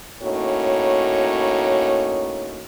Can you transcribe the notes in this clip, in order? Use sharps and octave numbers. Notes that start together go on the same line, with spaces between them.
A2 A#3 C#4 D#4 F#4 C#5